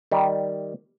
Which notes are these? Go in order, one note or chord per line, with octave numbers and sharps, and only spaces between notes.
D#3 G3